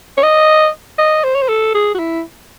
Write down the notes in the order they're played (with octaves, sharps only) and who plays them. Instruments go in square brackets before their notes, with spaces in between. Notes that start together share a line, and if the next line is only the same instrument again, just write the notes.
[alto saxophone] C#5
D#5
D#5
C5
C#5
C5
A4
G#4
F#4
E4